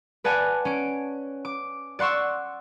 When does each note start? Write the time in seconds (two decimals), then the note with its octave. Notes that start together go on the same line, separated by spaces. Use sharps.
0.24 B4 D5 F#5 G#5 A5
0.65 C#4 D7
1.45 D6
1.99 D5 F#5 C6 C#6 E6